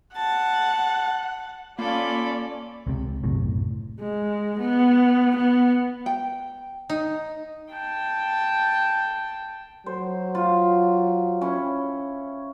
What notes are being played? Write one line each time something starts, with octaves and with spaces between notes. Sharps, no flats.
F#5 A5
A#3 C#4 F4 A4 D5 B5
C#2 C3
F#1 B1 A2 C3
G#3
B3
B3
G5
D#4
G5 A5
F#3 C5
F4
C#4 E4